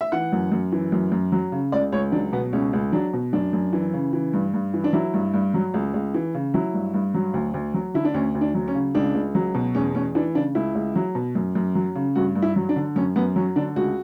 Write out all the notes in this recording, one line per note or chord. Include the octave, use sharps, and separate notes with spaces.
E5
E3 F#5
F#2
F#2
E3
F#2
F#2
F#3
C#3
C#2 D5
C#2 C#5
F#3 D4
B2 B3
C#2 C#4
C#2
F#3 D4
B2
F#2 D4
F#2
E3
C#3
E3
G2
G2
E3
D4
F#3 E4
G2
G2
F#3
C#2
C#2
E3
C#3
F#3 E4
G2
G2
F#3
D2
D2
F#3
D3 E4
D4
D2 C#4
D2
D4
F#3
C#4
C#3
C#2 D4
C#2
F#3
B2
E2 C#4
E2 C#4
E3 D4
C#3 D4
C#2 E4
C#2
F#3
B2
F#2
F#2
F#3
C#3
G2 F#4
G2
E4
F#3
D4
D3
F#2 C#4
F#2 B3
F#3 C#4
D3 D4
C#2 F#4